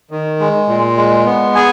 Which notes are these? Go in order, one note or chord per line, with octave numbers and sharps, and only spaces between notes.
D#3
G#3
A#2
G#3
B3
G#4 G#5